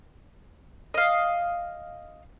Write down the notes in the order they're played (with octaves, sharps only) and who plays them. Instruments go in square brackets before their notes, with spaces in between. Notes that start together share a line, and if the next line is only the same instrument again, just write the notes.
[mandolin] D#5 F5